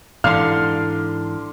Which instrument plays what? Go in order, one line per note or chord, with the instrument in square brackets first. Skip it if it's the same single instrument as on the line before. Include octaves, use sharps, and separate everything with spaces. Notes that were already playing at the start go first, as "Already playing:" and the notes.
[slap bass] G#2 E3 [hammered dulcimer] D3 C6 [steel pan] F5 [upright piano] F6